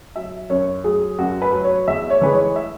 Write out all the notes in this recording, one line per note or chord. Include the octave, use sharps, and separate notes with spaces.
F#3 E5
F#2 C#5
F#3 G#4
F#2 F#4
B4
F#3
C#5
E2 E5
C#5
E3 G#3 B4
C#5
E5